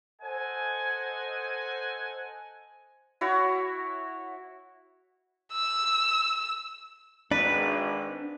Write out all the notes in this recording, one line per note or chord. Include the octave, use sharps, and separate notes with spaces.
A4 C5 D#5 F#5 G#5
E4 F#4 C#5
E6
G#1 D4 B4